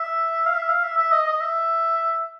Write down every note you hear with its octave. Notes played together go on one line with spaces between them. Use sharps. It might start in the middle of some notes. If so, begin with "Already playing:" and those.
Already playing: E5
F5
E5
F5
E5
E5
D#5
D#5
E5